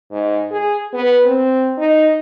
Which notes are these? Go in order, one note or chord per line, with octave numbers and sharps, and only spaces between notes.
G#2
G#4
B3
C4
D#4